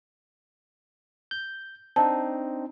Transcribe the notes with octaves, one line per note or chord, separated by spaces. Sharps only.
G6
C4 D4 D#4 A5